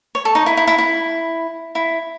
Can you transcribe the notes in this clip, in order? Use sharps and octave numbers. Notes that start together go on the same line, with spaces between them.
C#5
A4
D#4
E4
E4
E4
E4
E4